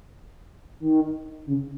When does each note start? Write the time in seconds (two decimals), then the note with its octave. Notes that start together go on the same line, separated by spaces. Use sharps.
0.80 D#3
1.46 C#3